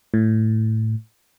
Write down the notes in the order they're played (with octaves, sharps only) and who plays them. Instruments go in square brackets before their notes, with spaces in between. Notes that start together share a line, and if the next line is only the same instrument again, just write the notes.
[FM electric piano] A2